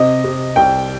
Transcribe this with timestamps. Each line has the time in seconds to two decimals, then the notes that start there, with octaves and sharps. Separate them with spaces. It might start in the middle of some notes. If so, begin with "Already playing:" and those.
Already playing: C3 D#5
0.24 C3
0.56 C2 G5